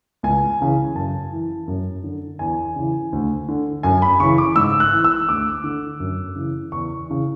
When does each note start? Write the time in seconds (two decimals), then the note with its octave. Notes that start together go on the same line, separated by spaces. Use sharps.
0.23 C#2 G#5
0.60 C#3 E3
0.95 F#2 A5
1.32 E3
1.68 F#2
2.04 D3
2.39 E2 G#5
2.76 C#3 E3
3.13 D2
3.48 D3
3.83 F#2 G#5
4.02 B5
4.20 C#3 E3 C#6
4.38 D6
4.56 G#2 E6
4.80 F#6
4.92 E3
5.04 E6
5.28 D2 D6
5.64 D3
6.00 F#2
6.36 C#3 E3
6.72 E2 C#6
7.08 C#3 E3